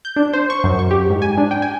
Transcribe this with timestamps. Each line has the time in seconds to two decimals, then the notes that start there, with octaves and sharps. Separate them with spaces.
0.05 G6
0.16 D4
0.33 C5
0.50 C#6
0.64 F#2
0.79 C#6
0.91 G4
1.09 G#2
1.22 G#5
1.38 D4
1.51 G5
1.62 G#5